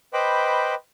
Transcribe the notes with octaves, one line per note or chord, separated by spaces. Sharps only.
B4 C5 D#5 G5 B5 D6